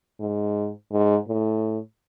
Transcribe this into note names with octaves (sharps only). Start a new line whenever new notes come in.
G#2
G#2
A2